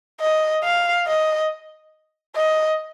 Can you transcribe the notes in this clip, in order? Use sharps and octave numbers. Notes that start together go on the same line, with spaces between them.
D#5
F5
D#5
D#5